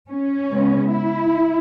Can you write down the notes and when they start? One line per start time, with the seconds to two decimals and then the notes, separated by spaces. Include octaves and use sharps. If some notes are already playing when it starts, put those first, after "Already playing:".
0.09 C#4
0.51 C#3 G#3 B3
0.92 E4